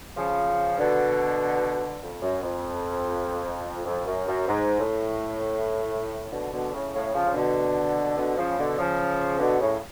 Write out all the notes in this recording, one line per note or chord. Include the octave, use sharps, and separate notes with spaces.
C#3 F3
B2 D3
F2
F#2
F2
F2
F#2
F#2
G#2
A2
B2 D3
B2 D3
A2 C#3
A2 C#3
C#3 F3
C#3
B2 D3
B2 D3
C#3 F3
B2 D3
C#3 F3
B2 D3
A2 C#3